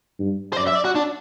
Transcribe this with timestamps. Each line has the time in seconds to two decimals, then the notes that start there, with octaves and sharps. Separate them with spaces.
0.19 G2
0.53 C5
0.57 F#2 D5
0.67 E5
0.75 D5
0.85 F#4
0.95 D4